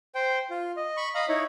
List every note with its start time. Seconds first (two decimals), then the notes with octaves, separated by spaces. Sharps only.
0.15 C5 G5
0.50 F4
0.77 D#5
0.97 B5 C#6
1.15 D#5 F5 A#5 B5
1.28 D#4 E4 C#5